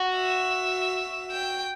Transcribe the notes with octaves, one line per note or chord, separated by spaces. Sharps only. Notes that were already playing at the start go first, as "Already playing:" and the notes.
Already playing: F#4
E5
G5